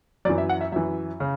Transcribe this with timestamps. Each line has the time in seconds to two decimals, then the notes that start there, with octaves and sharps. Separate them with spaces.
0.25 F#2 E3 D5
0.38 E5
0.49 F#5
0.61 E5
0.72 F#2 E3 E5
1.20 C#3